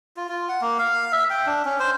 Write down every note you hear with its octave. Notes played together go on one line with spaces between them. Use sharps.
F4
F4
F#5
A#3
F5
E5
G5
D4
C#4
C5